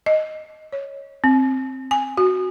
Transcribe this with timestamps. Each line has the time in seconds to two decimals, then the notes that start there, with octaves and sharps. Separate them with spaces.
0.06 D#5
0.73 C#5
1.24 C4
1.91 G#5
2.17 F#4